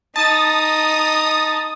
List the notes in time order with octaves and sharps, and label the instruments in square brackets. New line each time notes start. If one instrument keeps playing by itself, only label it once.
[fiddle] D#4 [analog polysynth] A5 A6 [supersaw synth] D#6